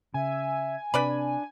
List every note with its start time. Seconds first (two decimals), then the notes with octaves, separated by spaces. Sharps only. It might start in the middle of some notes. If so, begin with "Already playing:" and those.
0.14 C#3 E5 G#5
0.94 C3 D4 B4 D5 B5